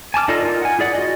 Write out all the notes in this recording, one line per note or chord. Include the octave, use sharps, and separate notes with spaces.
G#5 A5 D6 F6
D#4 F4 A4 D5 D#5
D#4 F4 A#4
F#5 G#5
E4 G#4 D5 F#5
F#4 D#5